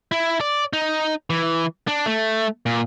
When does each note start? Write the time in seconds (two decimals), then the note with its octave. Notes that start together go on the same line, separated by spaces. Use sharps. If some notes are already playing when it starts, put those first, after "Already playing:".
0.12 E4
0.41 D5
0.73 D#4
1.30 E3
1.87 D4
2.06 A3
2.66 A#2